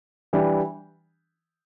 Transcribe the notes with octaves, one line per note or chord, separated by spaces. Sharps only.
E3 G3 D4 G4